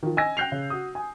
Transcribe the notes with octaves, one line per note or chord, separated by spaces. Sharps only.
D#3 F3
D#5 G#5 E6 G#6 A#6
G5 F#6 G6 C7 F7
C#3
F#4 D#6
G#5